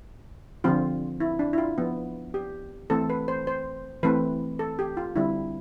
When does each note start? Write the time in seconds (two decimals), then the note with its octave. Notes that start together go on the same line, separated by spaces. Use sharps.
0.64 D3 F3 C4 F4
1.20 E4
1.39 D4
1.53 E4
1.58 F4
1.78 F3 B3
2.34 G4
2.90 E3 A3 C4 A4
3.10 B4
3.28 C5
3.47 C5
4.03 E3 A3 C4 B4
4.59 A4
4.79 G4
4.97 F4
5.16 D3 G3 C4 E4